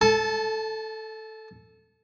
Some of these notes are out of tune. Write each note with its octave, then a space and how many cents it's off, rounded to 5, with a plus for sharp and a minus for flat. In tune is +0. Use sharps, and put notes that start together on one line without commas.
A4 +0 A5 -30